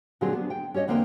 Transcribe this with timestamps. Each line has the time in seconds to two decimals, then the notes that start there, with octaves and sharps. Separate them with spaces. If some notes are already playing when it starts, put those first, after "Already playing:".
0.21 A#2 D3 F#3 C4 G4 G#4
0.33 B3 D4
0.50 G5
0.74 C#4 G4 C#5 D#5
0.88 E2 D3 A#3 C4 C5 G5